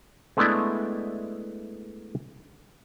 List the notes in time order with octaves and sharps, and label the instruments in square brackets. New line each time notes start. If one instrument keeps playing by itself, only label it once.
[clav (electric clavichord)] G#3 A3 B3 D4 E4 D5